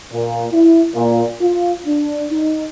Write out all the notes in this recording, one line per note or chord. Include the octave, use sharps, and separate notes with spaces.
A#2
E4
A#2
F4
D4
D#4